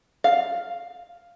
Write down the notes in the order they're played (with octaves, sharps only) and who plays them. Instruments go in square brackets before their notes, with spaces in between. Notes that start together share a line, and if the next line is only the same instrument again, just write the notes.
[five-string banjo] F5